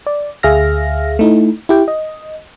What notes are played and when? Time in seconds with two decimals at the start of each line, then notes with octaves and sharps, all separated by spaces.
0.07 D5
0.43 D2 G#4 E5 F5 F6 A#6
1.19 A3 D#4 E4
1.69 E4 G4 G5
1.88 D#5